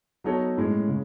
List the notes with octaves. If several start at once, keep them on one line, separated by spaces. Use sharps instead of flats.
F#3 B3 D#4 A4 C#5
A2 G#3 C#4
C#3